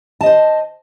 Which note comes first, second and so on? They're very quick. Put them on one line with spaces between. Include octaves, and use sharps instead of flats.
A5 D#5 C5